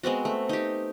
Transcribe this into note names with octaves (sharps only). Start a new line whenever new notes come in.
G#3 B3 C4 F#4
A3
D#4 G4